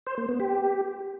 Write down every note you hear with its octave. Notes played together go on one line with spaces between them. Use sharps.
C5
A#3
B3
G4